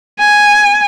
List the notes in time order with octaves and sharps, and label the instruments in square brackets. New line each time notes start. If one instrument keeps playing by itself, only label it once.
[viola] G#5